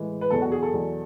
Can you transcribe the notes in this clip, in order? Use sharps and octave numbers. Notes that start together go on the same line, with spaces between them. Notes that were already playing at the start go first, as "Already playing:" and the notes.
Already playing: A2 E3 G#3
B4
E2 B2 F#3 A4
F#4
G#4
A4
E2 B2 F#3